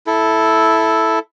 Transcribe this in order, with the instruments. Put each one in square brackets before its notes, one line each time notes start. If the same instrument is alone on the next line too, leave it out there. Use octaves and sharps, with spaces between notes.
[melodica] E4 A4